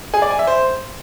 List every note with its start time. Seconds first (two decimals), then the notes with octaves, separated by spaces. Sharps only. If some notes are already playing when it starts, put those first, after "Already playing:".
0.14 G#4
0.22 D5
0.30 G#5
0.39 E5
0.47 C5